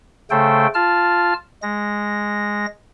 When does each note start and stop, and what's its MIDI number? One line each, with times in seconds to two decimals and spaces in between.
0.31 0.67 49
0.31 0.67 57
0.31 0.67 69
0.31 0.67 72
0.31 0.67 79
0.75 1.34 65
0.75 1.34 81
0.75 1.34 89
1.63 2.66 56
1.63 2.66 94